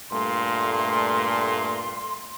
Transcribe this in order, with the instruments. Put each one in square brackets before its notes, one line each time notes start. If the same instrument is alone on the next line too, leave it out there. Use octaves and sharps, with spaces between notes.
[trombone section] G2 A#2 A3 [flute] C6